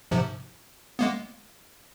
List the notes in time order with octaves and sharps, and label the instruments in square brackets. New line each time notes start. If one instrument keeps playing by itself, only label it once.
[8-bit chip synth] G#2 C3 F3
G#3 A#3 B3